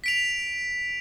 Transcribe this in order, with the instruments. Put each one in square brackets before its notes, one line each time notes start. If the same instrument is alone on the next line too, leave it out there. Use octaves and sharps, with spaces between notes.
[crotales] B6 D7 F7